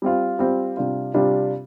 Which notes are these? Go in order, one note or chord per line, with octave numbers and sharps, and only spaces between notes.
G3 C4 F4
G3 C4 F4
C3 G3 D4 F4
C3 G3 D4 F4